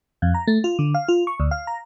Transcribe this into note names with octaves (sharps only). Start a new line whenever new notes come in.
F2
A#5
A3
F4
D3
F5
F4
C#6
D2
F5
A#5